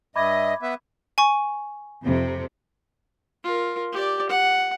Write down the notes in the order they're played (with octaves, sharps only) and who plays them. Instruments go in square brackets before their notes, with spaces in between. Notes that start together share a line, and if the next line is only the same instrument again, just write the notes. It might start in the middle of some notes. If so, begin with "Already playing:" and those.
[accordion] G2 D#5 [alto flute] E5 [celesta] B5 D6 G#6
[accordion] B3 B4 E5
[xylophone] G#5 C#6
[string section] F2 C3
[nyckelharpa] F4 A#4
G4 D5
F#5